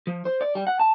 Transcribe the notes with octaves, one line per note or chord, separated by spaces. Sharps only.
F3
C5
D5
G3
F#5
A5